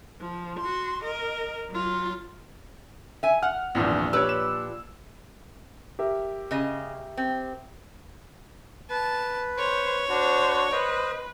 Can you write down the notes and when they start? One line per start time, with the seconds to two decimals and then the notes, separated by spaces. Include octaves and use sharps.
0.21 F3
0.60 F#4 C6
1.04 A#4 D#5
1.70 F#3 F4
3.23 E5 G#5
3.43 F#5 F6
3.75 G#1 E2 A#2 F3 D4
4.13 G4 B4 C#5 D5 E6
4.29 E7
5.99 G4 A#4 E5
6.51 C#3 D#5
7.17 C4
8.90 B4 A5
9.58 C5 C#5
10.09 D4 F#4 C5
10.72 B4 C5 D#5